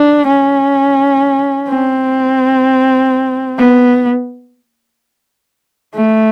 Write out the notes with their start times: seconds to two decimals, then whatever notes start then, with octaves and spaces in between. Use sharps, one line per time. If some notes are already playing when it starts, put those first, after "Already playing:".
Already playing: D4
0.27 C#4
1.70 C4
3.59 B3
5.95 A3